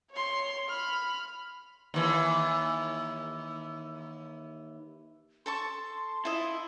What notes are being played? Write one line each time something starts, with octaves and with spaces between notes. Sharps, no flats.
C#5 C6
B5 F6
D#2 E3
A4 A5 C6 C#6
E4 F4 A4 D#5